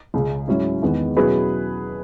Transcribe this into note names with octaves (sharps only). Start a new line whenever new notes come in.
C#2 C#3 G#3
G#2 F#3 C#4 E4
E2 D#3 G#3 B3
B2 F#3 C#4 E4 G#4 B4